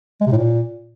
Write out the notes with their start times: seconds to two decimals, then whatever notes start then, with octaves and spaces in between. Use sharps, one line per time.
0.21 G#3
0.26 C3
0.32 A2
0.37 A#2